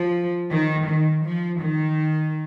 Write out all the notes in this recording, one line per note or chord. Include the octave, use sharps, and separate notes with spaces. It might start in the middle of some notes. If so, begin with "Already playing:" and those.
Already playing: F3
D#3
D#3
F3
D#3